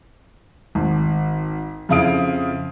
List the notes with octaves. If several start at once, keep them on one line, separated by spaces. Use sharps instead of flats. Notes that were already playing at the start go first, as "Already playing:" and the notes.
G#1
F2 C#3 E4 F5 D#6 D7